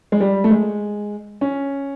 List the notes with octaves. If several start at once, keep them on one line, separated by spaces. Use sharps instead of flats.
G#3
G3
A3
G#3
C#4